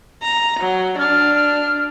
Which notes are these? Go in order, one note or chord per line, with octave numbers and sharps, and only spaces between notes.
A#5
F#3
D4 F6
F6